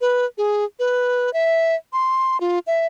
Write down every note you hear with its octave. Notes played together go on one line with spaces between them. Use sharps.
B4
G#4
B4
E5
C6
F4
E5